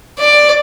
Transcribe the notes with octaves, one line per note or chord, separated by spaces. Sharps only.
D5